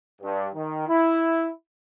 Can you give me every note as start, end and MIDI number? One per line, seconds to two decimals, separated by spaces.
0.22 0.48 43
0.55 0.87 51
0.88 1.48 64